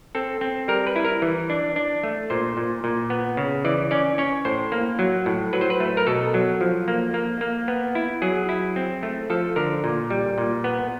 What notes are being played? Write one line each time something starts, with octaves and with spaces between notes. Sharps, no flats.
C4 A4
C4
G3 A#4
B4
E4
A#4
E3
D4
D4
A3
A#2 C5
A#2
A#2
B3
C#3
E3 D5
C#4 D5
C#4 C#5
A2 C5
A#3
F#3
A2
F#3 B4
C5
B4
A3
A#4
B2 A4
F#3
F3
A#3
A#3
A#3
B3
E4
F#3 G#4
E4
C4
A3
F3 A4
D3 A#4
A#2
G3
A#2
B3